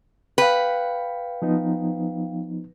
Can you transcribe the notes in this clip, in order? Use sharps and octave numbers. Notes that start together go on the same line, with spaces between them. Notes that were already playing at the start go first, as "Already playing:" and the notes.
B4 F5 G5
F3 B3 D#4